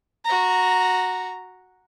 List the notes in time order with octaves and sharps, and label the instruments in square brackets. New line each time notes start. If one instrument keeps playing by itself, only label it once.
[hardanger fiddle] F#4 A#5